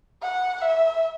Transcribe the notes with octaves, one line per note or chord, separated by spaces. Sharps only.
F#5
E5